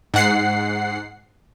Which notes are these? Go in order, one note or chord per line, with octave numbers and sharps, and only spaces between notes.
G#2 F#5 C7